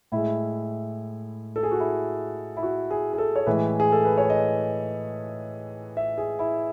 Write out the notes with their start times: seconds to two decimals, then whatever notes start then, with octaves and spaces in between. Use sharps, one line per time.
0.12 A2 G#3 E4
1.56 A4
1.63 G#4
1.71 F#4
1.80 E4
2.57 E4
2.63 F#4
2.90 G#4
3.13 G#4
3.18 A4
3.36 C#5
3.46 A2 E3 G#3 B4
3.80 G#4
3.92 A4
4.05 B4
4.18 C#5
4.30 D#5
5.97 E5
6.18 G#4
6.39 E4